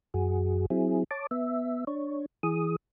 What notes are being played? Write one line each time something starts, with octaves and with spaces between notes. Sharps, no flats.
F#2 F#4 G#4
F#3 C4 E4 G#4
C#5 A5 D6
B3 E5
D4 C#5
E3 G#4 D#6